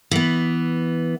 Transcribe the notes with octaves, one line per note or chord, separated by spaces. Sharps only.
E3 B3